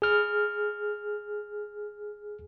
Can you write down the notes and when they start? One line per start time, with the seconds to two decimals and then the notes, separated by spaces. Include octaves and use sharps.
0.02 G#4 F6